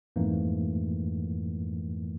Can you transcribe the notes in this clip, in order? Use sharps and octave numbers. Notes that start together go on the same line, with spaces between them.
F2 G#2 E3 A3 A#3